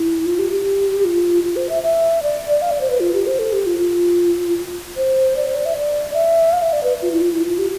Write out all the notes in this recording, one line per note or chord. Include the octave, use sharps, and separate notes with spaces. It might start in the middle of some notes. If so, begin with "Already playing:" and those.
Already playing: E4
F4
G4
G4
F4
F4
C5
E5
E5
D5
F5
D5
C5
B4
F4
G4
C5
A4
G4
F4
F4
C5
D5
C5
D5
E5
D5
E5
F5
E5
D5
B4
F4
E4
F4
E4
F4
G4